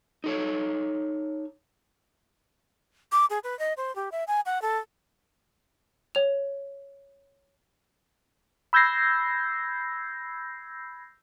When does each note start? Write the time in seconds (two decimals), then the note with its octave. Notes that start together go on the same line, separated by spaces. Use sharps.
0.24 D#4 A4 C#5
3.12 D6
3.30 G#4
3.44 B4
3.59 D#5
3.77 C5
3.96 G4
4.12 E5
4.27 G#5
4.46 F#5
4.62 A4
6.15 C#5 F7
8.73 B5 E6 G6 G#6 A#6 C7